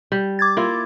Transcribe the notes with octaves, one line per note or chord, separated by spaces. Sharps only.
G3
D6 G#6 A6
A#3 E4 F4